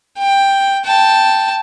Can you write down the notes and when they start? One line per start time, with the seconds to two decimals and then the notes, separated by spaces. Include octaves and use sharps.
0.18 G5
0.85 G5 A5